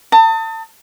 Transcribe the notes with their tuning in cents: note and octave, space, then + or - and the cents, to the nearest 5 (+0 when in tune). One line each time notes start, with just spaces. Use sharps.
A5 +35 D#6 +25